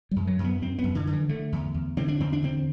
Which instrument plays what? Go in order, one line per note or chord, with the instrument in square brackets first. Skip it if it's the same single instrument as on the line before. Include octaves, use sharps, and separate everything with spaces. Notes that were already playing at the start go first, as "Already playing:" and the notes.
[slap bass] F#2 G3
F#3
F#2
B3
F#2 C4
B3
F#2
D3
D3
E3
D3 A3
E2
E2
D3 C4
D4
E2 C4
D4
D3 C4